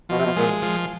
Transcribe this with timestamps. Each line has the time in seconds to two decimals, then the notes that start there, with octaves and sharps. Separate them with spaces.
0.09 B2 F3
0.18 C3
0.25 B2
0.36 A#2 G#3
0.62 F3